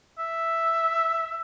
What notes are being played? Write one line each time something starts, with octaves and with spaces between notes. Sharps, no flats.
E5